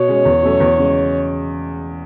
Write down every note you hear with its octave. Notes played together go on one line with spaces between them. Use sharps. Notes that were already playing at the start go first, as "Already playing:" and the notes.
Already playing: B2 C#5
G#3 C#4
E2
B2 F#3 A3 C#4
E2
C#3 G#3